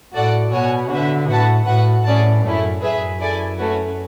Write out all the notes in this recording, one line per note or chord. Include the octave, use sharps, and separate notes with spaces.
A2 F#4 A4 D5 F#5
B2 F#4 C#5 G#5
D3 F#4 B4 E5
A2 F#4 B4 F#5 A5
A2 F#4 B4 F#5
A2 C#4 G#4 D5 A5
F#2 A3 C#4 E4
F#2 G#4 B4 E5
E4 A4 D5 G#5
A3 C#4 F#4 B4